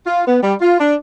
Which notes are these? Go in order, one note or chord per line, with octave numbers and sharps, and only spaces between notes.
F4
B3
G3
F4
D4